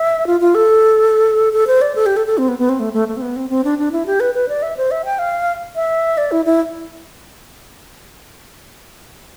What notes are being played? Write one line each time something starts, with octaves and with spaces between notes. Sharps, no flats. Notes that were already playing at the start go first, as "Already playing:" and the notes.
Already playing: E5
F4
F4
A4
A4
C5
D5
A4
G4
A4
A4
C4
B3
B3
C4
A3
A3
A3
C4
B3
C4
C4
D4
D4
E4
G4
B4
B4
D5
E5
C5
E5
G5
F5
E5
D5
E4
E4